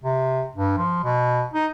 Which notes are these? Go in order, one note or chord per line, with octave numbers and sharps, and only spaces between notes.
C3
G2
F3
B2
D#4